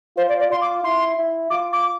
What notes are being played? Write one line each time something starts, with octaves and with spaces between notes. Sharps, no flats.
F4 C5
D5
D5
F4 C6
D6
E4 C6
E4
F4 D6
D6